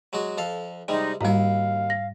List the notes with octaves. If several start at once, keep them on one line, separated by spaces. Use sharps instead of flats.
F#3 G#3 F#4
F2 A4 F5
C3 G3 G#3 D#4
D#2 G#2 G3 E4 F5
A#6